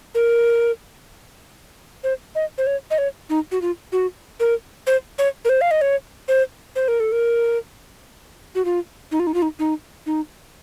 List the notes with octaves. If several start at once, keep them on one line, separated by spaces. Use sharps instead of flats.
A#4
C5
D#5
C5
C#5
D#5
C#5
D#4
F#4
F4
F#4
A#4
C5
C#5
A#4
C5
F5
D#5
C#5
C5
C5
A#4
A4
A#4
F#4
F4
D#4
F4
D#4
F4
D#4
D#4
D#4